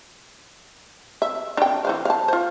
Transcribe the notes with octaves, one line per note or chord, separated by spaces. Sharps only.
E5
D4 G5
E3 C5 F5
F5 A5
F4 C5